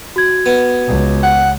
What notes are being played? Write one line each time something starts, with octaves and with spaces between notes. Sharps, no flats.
F#4 G#6
B3
C#2
F#5